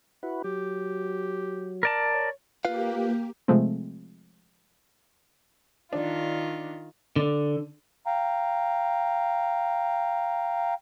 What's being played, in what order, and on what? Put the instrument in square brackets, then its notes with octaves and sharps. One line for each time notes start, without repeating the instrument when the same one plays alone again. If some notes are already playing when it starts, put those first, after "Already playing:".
[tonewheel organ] E4 F#4 B4
[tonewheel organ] F#3 [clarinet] G4
[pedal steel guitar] A#4 D5 A5
[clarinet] C#5
[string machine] A#3 G4 [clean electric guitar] F4 B4 F5
[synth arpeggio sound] C3 F3 G#3 A3 C4
[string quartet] D#3 F4 [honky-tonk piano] D4
[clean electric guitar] D3
[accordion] F5 G5 A#5